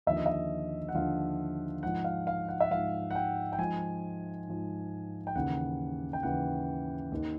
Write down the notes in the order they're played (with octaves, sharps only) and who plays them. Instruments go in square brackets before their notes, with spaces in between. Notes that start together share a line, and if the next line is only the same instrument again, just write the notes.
[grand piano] D#2 D3 F3 E5
D#5
E5
F#5
D#2 D3 F3 F5
G#2 F3 F#5
F5
F5
F#5
E5
G#2 F3 F5
F#5
G5
G5
G#2 F3 G#5
G#2 F3
G5
D#2 C#3 E3 F#5
G5
D#2 C#3 E3 F#5
D#2 D#3